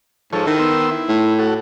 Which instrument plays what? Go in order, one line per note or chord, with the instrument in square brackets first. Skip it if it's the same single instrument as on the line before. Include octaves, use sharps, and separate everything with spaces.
[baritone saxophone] G#2 [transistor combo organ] F3 A4 C#5
[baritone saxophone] D#3 [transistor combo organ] E4
[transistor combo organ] B3 C6 E6
E4
[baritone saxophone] A2
[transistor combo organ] F#4 A4